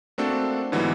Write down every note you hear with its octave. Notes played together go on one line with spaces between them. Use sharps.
A3 A#3 C4 D4 F#4 A4
G#2 D3 E3 F#3 G3 B3